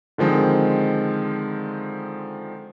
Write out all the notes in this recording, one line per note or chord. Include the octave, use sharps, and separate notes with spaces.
D3 D#3 F3 G#3 C4